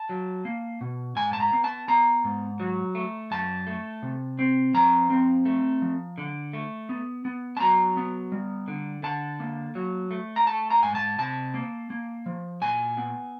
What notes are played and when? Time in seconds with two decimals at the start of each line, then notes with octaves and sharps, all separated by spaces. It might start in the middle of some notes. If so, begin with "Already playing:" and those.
Already playing: A5
0.09 F#3
0.45 A#3
0.81 B2
1.16 G#2 G#5
1.33 A5
1.40 A#5
1.53 B3
1.64 A5
1.88 B3 A#5
2.24 G#2
2.60 F#3
2.95 A3
3.31 F#2 A5
3.67 A3
4.03 C3
4.39 C4
4.74 F3 A#5
5.10 C4
5.46 A3
5.82 F3
6.18 D3
6.53 A3
6.89 B3
7.25 B3
7.57 A5
7.60 F#3 A#5
7.97 B3
8.32 G3
8.68 D3
9.03 D3 A5
9.40 A#3
9.75 F#3
10.11 A3
10.36 A#5
10.47 A3 A5
10.70 A#5
10.83 G#2 G#5
10.95 A5
11.19 C3 A5
11.54 A#3
11.90 A#3
12.26 F3
12.62 A#2 G#5
12.97 B3